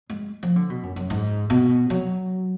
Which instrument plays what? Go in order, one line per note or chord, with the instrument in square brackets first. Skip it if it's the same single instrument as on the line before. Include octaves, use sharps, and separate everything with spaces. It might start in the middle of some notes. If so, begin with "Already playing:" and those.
[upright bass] G#3
F3
D3
B2
F#2
F#2
G#2
B2
F#3